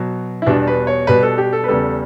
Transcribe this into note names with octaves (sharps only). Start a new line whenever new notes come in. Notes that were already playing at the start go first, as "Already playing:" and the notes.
Already playing: B2 F#3
E4
E2 B2 G3 D4
B4
C#5
B2 G3 B4
A4
G4
A4
B4
E2 C#3 G3 A4